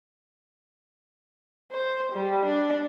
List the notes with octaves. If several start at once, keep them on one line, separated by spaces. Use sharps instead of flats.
C5
G3
D4